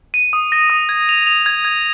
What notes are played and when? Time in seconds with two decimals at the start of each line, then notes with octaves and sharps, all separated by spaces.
0.14 D#7
0.33 D#6
0.52 A#6
0.70 D#6
0.89 G#6
1.09 F7
1.27 F7
1.46 G#6
1.65 G#6